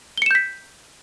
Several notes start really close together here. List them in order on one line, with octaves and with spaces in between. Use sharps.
G7 C#7 E7 G6 B6